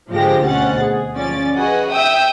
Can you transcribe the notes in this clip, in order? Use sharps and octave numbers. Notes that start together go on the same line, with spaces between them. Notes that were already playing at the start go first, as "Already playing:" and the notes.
G#2 D3 F3 G#3 G4 A#6
D2 B2 C4 C#4 F#5 A6
G#4
F3 C#4 D5 A6
F#4 G#4 B4 D#5 F#5
E5 G5 D#6 E6 G6